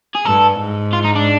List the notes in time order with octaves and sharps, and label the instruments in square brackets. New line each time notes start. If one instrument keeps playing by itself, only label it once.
[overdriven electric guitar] G#4
[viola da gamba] G2 [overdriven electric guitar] A4
[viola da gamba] G#2
[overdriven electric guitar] F4
D#4
D4